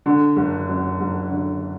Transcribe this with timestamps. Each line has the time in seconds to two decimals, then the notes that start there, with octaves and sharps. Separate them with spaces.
0.06 D3
0.37 F#1
0.69 F#2
1.01 F#1
1.31 D3